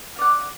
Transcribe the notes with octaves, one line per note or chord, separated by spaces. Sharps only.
D5 F5 F#5